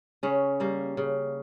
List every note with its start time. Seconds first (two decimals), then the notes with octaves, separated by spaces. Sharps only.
0.23 C#3 C#4
0.60 G3 A#3
0.97 C#3